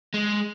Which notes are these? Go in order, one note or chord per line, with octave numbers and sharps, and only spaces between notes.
G#3